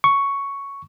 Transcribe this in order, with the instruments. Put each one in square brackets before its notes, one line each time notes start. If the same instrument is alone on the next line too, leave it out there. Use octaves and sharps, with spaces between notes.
[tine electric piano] C#6